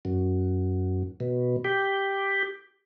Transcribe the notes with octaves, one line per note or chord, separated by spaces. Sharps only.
F#2
B2
G4